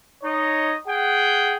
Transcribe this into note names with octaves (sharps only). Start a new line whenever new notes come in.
D#4 C#5 D#5
G#4 F#5 G5